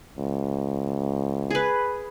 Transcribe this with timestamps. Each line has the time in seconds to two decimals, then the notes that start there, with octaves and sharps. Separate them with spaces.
0.18 C#2
1.51 G#4 B4